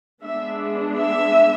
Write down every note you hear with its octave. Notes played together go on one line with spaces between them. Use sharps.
G#3 B3 D4 E5
E5